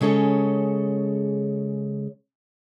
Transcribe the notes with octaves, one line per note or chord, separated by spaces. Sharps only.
C#3 G#3 C#4 A4 C#5